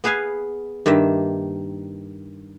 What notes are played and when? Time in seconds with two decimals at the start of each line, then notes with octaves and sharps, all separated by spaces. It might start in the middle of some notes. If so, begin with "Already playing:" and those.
0.04 B3 G#4 B4 F5 G#5
0.86 G2 D#3 A#3 E5